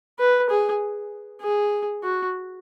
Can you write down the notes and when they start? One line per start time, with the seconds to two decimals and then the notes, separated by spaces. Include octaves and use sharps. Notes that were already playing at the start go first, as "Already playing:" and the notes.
0.19 B4
0.50 G#4
1.42 G#4
2.03 F#4